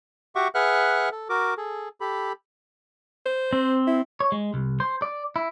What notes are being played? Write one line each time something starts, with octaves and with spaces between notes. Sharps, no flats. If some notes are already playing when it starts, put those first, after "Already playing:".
F#4 G4 E5 F#5 C#6 D6
G#4 B4 E5 F#5 F6 F#6
A4
F#4 A#4 D6
G#4 A4
G4 A4 B5
C5
C4
E4
C#5
G#3
C2
C5
D5
E4